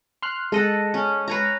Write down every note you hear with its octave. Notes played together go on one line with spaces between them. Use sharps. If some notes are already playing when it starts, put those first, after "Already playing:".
C6 F6 F#6
G#3 A4 D#5 F#5
C#4
B4 C#5 A#5